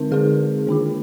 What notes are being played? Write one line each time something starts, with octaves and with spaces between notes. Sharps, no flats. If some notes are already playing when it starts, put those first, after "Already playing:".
Already playing: D3 G#3 C4 D#4 A#4
D3 G#3 C4 D#4 G#4
D#3 A#3 D4 F4